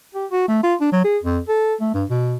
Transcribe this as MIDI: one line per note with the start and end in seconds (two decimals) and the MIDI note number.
0.15 0.26 67
0.31 0.47 66
0.48 0.62 57
0.63 0.75 65
0.81 0.88 62
0.92 1.04 54
1.04 1.18 68
1.23 1.39 41
1.48 1.74 69
1.81 1.92 57
1.94 2.04 43
2.10 2.36 47